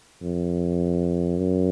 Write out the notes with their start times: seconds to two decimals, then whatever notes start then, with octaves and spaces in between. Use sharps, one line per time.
0.22 F2
1.38 F#2